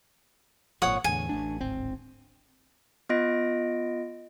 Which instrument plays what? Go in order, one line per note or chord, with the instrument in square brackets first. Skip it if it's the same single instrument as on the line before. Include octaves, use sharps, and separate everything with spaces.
[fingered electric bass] G#1 A#2 F3 [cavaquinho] C#5 F#5 D#6
[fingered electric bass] E2 A2 D3 [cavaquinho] G#5
[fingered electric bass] A1 A3 D4
D1 G#1 C4
[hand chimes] B3 F4 D#5 A#6 D7